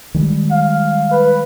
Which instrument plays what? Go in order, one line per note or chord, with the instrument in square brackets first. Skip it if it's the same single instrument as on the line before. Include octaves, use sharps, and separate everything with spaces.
[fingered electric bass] D#3 G3 G#3
[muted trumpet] F5
B4